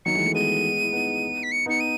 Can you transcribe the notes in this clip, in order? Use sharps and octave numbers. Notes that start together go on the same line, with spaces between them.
D#3 F#3 C#7
E3 G#3
F#3 A3
G#3 B3 D#7
E4
B3 D#4
B6
C#7
B3 D#4 C#7
D#7